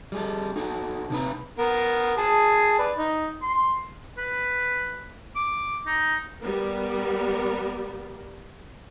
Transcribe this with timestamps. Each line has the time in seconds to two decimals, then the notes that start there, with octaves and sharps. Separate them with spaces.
0.12 G3 G#4 A4
0.56 D#4 F#4 A4
1.10 C3 D#4 B4
1.59 B3 A#4
2.17 G#4 A5
2.79 B4 D5
2.98 D#4
3.42 C6
4.18 B4
5.36 D6
5.86 D#4
6.40 G3 B3 A#4